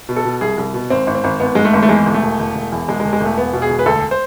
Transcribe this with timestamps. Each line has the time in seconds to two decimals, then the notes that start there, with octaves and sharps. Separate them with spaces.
0.09 B2
0.16 A4
0.25 B2
0.41 C2 G#4
0.58 C2
0.74 B2
0.90 G#1 C4
1.07 G#1
1.15 C4
1.24 G#1
1.40 G#1 B3
1.55 G#2 G#3
1.65 A3
1.73 G#1
1.83 A3
1.89 E2 G#3
2.06 E1
2.14 A3
2.22 E1
2.39 E1
2.55 E1
2.72 E2
2.88 E1 G#3
3.00 G#3
3.05 E1
3.13 G#3
3.20 E1 A3
3.37 E1 B3
3.53 B2
3.62 G#4
3.70 E1
3.79 B4
3.86 D2 A4
4.11 C5